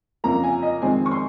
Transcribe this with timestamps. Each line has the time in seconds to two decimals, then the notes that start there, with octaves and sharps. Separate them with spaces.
0.24 F2 C#3 F3 A#3 A#5
0.43 G#5
0.62 D#5
0.82 F2 D#3 G#3 C4 G#5
1.06 C#6
1.11 C6